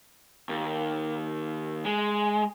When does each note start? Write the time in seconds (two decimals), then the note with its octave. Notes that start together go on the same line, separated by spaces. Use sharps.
0.49 D#2
1.86 G#3